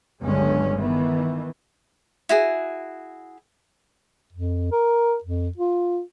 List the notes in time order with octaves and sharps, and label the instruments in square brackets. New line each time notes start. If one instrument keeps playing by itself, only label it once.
[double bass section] G1 C#2 D3 F#3 G#3 C#4
D#3 E3 B3
[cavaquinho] E4 F#4 G#4
[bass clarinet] F2
A#4
F2
F4